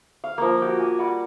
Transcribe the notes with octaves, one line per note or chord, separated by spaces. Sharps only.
F5
F3 A#3
F#4 G4
G#5
G3 D5 F#5